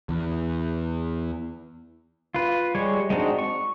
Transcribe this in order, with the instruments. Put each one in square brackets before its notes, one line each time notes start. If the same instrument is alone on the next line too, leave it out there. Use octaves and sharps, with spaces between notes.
[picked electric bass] E2
[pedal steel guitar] F4 B4
G3 G#3 C#5
G#3 C4 D4 D#4 F#4
C#6